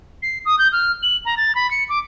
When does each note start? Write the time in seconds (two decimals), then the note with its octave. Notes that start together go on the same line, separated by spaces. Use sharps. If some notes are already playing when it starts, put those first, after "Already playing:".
0.22 C7
0.45 D#6
0.59 G6
0.72 F6
1.03 F#7
1.25 A#5
1.37 A6
1.55 B5
1.71 C#7
1.89 D6